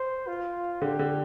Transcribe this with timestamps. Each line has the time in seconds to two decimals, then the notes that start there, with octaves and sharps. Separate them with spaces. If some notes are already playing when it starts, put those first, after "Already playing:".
Already playing: C5
0.28 F4
0.82 D3 G4
0.99 D3